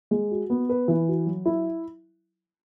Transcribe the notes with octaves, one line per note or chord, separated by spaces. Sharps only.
G#3
F#4
B3
B4
E3
F#4
F#3
E4